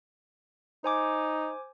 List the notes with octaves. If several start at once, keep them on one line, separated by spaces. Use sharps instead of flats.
D#4 C5 G#5 D6